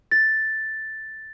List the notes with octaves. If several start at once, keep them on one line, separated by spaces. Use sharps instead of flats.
A6